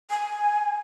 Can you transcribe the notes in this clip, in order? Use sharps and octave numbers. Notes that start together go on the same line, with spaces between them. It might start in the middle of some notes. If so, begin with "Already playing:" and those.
G#5